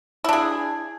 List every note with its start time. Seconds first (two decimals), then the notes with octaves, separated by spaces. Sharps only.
0.24 E4
0.29 D4
0.33 G#4